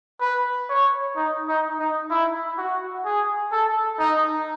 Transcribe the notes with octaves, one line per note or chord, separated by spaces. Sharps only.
B4
C#5
D#4
D#4
D#4
E4
F#4
G#4
A4
D#4